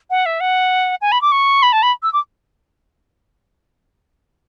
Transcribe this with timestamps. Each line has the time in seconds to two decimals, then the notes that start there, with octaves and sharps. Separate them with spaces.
0.10 F#5
0.26 E5
0.40 F#5
1.01 G#5
1.12 B5
1.21 D6
1.32 C#6
1.63 B5
1.73 A5
1.83 B5
2.03 E6
2.13 D6